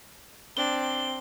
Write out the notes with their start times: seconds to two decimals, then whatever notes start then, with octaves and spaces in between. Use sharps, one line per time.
0.57 C4 D4 G7